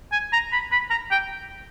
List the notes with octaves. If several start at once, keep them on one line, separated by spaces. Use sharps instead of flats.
G#5
A#5
B5
B5
A#5
G5